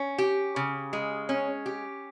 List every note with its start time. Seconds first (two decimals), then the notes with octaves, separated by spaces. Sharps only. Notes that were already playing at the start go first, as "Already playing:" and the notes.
Already playing: C#4
0.18 G4
0.56 C#3
0.93 G#3
1.29 C#4
1.66 G4